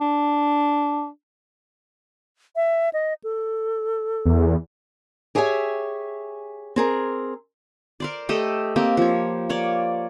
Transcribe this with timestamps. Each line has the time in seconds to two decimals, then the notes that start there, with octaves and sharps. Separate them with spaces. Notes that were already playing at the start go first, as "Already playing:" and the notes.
0.01 D4
2.56 E5
2.93 D#5
3.24 A4
4.25 E2
5.35 G4 G#4 C#5 E5 F#5 G#5
6.76 C4 G#4 A#4
8.00 A#4 C5 D5
8.29 A3 G4 A4 D#5
8.76 A#3 C4 G4
8.97 F3 C#5
9.49 A#3 C#5 D5